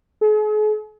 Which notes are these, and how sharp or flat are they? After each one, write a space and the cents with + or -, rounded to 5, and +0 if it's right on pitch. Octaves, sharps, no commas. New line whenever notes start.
G#4 +45